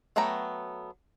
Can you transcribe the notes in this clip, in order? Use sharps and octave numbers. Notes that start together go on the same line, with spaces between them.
F#3 A3 B3 G5 A#5